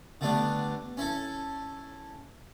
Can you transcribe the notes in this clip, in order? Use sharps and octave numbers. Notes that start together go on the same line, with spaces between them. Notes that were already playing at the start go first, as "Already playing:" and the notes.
D3 G3 A3 B3 D4
C#4 E4 A4